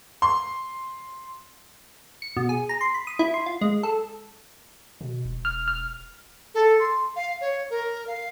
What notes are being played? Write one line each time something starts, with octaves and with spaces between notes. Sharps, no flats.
C6
C#7
B2
G#4
A#5
C6
B5
D#6
E4
C6
F4
G#3
A4
B2
E1
F6
F6
A4
C6
F5
C#5
A#4
F5